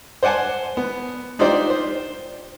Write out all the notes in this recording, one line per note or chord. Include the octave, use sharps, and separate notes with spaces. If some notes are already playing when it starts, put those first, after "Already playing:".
C5 D5 F#5 G#5 A5
B3
D4 D#4 F4 G4 C5 D5
C5